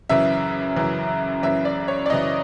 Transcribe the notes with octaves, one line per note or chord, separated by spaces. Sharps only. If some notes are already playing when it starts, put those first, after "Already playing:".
F#2 C#3 E3 E5
F#2 C#3 E3
F#2 C#3 E3 E5
D5
C#5
D5
F#2 C#3 E3 D#5